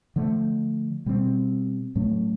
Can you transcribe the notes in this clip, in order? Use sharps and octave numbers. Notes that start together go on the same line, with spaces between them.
D3 F3 A3
B2 G3 C4
A2 F#3 A3 C#4